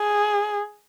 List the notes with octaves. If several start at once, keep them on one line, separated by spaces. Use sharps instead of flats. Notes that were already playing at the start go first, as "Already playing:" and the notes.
Already playing: G#4